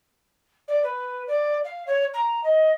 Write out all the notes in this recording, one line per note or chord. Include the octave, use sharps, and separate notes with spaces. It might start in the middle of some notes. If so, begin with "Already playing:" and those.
D5
B4
D5
F5
C#5
A#5
D#5